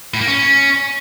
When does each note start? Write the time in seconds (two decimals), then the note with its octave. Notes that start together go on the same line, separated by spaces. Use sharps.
0.14 A2
0.21 A#3
0.28 C#4